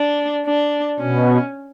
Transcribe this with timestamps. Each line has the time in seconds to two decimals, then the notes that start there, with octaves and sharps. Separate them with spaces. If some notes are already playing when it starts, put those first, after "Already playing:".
Already playing: D4
0.45 D4
1.00 B2 C#4